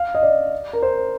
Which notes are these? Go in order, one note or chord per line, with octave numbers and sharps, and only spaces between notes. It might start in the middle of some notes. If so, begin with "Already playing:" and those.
Already playing: F5
D#5
D5
A#4
C5